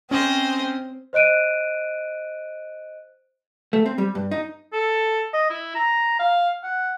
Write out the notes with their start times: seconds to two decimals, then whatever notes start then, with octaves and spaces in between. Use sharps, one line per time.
0.11 C4 C#4 C5 D#5
1.13 C5 D#5 F#6 D7 D#7
3.73 A3
3.86 C4
3.98 G3
4.15 G2
4.31 D#4
4.73 A4
5.33 D#5
5.50 E4
5.75 A#5
6.19 F5
6.63 F#5